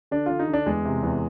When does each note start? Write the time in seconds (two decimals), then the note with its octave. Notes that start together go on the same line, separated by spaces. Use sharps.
0.11 D3 D4
0.26 D3 F4
0.39 D#4
0.48 D3
0.53 D4
0.66 E2 G#3
0.85 C3
1.03 E2